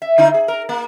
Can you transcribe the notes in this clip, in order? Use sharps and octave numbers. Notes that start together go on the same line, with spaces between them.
E5
D3 D#4 E4
G#4
A#4
A#3